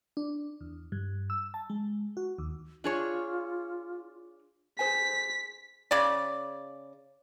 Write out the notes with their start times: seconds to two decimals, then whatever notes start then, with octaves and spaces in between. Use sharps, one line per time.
0.17 D4
0.61 E2
0.92 G2
1.30 E6
1.54 A5
1.70 G#3
2.17 F#4
2.38 D#2
2.84 D4 F4 G#4 C#5
4.79 G#4 C5 G#5 B6
5.91 C#3 D5